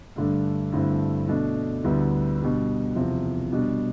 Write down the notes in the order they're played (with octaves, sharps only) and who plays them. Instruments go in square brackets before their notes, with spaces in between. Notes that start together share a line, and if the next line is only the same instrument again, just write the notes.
[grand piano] G2 D3 A3 D4
G2 D3 A3 C4 E4
B2 A3 D4
D2 D3 G3 B3 E4
B2 G3 D4
E2 C3 F3
B2 G3 D4